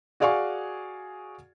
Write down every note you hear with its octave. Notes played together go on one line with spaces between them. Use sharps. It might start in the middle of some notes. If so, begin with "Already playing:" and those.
F#4 G#4 D5 F5 G#5 C#6